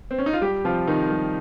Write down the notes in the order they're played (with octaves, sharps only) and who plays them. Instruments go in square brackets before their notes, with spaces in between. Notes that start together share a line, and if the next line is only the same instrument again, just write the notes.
[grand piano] C4
C#4
D#4
F4
G3 G4
C3 F3 F4
C3 D#3 D#4
G3